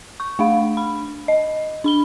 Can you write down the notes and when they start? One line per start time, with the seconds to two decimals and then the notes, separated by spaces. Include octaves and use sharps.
0.20 C#6
0.39 A3 D4 F5
0.77 B5
1.28 D#5
1.84 D4 B5 G7